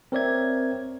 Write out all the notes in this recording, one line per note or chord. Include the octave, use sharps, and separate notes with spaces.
C4 A#4 C#5 D5 E5 G#6